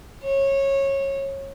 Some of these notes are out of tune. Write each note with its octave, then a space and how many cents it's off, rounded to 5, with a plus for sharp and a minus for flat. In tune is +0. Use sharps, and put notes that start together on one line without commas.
C#5 -20